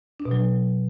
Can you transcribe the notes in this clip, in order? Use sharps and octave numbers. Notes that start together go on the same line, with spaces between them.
D4
B2
F#3